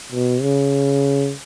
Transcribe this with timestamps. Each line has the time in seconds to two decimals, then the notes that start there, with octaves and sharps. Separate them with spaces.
0.12 B2
0.42 C#3